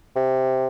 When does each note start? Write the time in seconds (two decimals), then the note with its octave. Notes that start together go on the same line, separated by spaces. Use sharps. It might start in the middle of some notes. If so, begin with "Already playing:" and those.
0.16 C3